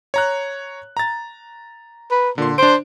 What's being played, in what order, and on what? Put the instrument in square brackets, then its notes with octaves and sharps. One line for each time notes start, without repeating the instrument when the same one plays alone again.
[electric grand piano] C#5 A#5 F#6
A#5 A6
[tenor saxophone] B4
[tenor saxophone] A#2 [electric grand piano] D3 C6
[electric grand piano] D4 D7 [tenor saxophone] C5